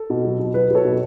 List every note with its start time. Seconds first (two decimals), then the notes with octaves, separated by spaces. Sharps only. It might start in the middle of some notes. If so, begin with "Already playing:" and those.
Already playing: A4
0.10 B2
0.25 F#3
0.39 B2
0.54 F#3 B4
0.71 F#3 A4 C#5
0.85 B2